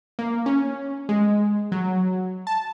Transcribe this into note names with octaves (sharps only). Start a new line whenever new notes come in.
A#3
C#4
G#3
F#3
A5